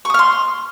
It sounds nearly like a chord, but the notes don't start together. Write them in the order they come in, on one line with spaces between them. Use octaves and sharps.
C#6 D#6 F6 C6